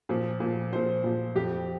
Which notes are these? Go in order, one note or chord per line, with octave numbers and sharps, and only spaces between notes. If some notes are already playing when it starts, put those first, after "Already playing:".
A#2 F3
A#2 F3
A#2 F3 C5
A#2 F3
F2 F3 G4